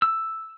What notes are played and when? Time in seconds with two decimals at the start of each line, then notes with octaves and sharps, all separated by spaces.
0.02 E6